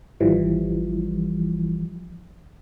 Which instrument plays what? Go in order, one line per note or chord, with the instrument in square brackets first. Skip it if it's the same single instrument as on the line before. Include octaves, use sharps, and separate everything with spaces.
[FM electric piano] G#1 E3 F3 G3